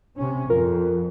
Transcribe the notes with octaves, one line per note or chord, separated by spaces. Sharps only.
C3 C#4
F2 F4 A#4